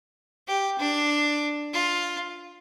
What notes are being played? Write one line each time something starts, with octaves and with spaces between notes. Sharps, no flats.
G4
D4
F4